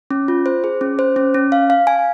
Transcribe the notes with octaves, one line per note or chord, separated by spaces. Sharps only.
C#4
F4
C5
G#4
C#4
C5
C#4
C#4
F5
F5
G#5